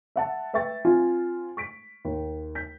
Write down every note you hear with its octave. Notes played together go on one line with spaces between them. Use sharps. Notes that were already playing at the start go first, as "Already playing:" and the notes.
E5 F#5 A5
B4 E5 G5 C#6 A6
C4 F4 G#5
C#6 B6 D7
D#2
G6 B6